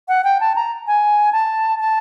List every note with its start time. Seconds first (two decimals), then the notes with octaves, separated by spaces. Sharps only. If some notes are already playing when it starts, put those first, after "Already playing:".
0.08 F#5
0.24 G5
0.40 A5
0.56 A#5
0.87 G#5
1.32 A5
1.79 A5